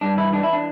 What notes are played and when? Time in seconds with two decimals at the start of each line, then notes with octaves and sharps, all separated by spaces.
0.01 G2 D4
0.17 E3 E4
0.33 E3 D4
0.43 E4
0.53 D4